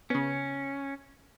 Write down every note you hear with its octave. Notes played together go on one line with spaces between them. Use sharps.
C#3 B3 C#4